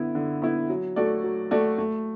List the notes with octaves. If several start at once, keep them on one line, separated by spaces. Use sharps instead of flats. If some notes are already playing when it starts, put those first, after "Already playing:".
Already playing: D3 B3 E4
D3
B3 E4
F#3
A3 F#4 A4 D5
F#3
A3 F#4 A4 D5
A3